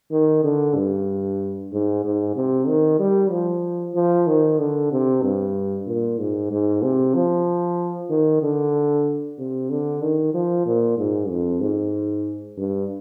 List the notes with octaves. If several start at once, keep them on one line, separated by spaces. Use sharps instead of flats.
D#3
D3
G2
G#2
G#2
C3
D#3
G3
F3
F3
D#3
D3
C3
G2
A#2
G#2
G#2
C3
F3
D#3
D3
C3
D3
D#3
F3
A#2
G#2
F2
G#2
G2